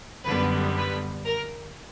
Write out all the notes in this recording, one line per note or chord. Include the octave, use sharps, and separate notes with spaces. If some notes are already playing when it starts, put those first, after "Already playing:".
F#2 D3 G3 B3 B4
B4
A#4